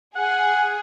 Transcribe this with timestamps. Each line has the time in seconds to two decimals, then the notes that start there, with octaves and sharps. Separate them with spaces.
0.16 G#4 F#5